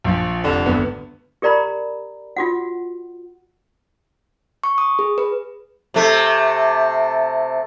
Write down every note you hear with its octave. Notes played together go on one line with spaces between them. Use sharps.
A#1 F3
F1 D3
G#1 D2 B3
G4 A#4 D5 A#5 B5
F4 F#4 F#5
C#6
D#6
G#4
B4
C3 A3